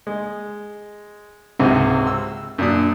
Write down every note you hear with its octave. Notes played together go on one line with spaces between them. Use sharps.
G#3
C#2 G#2 C3 C4 F#4
E6
F#2 A#2 D4 D#6